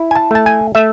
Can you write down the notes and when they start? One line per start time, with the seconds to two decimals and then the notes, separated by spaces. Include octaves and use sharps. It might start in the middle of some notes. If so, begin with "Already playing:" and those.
Already playing: E4
0.11 G#5
0.15 A5
0.31 A3 A5
0.46 G#5
0.75 A3 E5